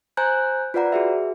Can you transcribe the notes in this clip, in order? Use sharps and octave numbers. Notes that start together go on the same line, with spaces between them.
C5 G#5 A#5 F#6 G6
F4 B4 D5 F#5 A#5
F#4 G#4 E5